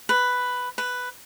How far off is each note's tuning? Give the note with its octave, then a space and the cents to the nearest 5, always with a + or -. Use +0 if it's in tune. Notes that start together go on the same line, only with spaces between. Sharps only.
B4 +5
B4 +5